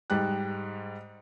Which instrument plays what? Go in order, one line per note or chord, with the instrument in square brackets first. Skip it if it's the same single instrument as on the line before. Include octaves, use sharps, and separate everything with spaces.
[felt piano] G#2 G3 F#6